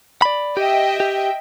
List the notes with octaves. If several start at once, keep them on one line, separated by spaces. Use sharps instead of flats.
D5 B5
G4 D#5 E5 G5
G4